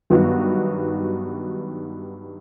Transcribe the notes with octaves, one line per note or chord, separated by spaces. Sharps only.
G2 D#3 F#3 B3 F#4